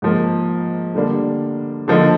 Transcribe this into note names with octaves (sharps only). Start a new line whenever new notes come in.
G#2 F3 A#3
D3 G3 A#3 D4
D3 F3 A#3 D#4